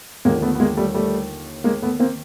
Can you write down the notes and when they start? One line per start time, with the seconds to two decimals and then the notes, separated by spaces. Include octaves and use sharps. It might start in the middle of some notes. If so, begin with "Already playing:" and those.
0.25 D#2 D3 F3 G#3 A#3
0.42 A3 B3
0.55 B3
0.60 G#3 A#3
0.77 G3 A3
0.94 G3 A3
1.64 G#3 A#3
1.82 A3 B3
2.00 A#3 C4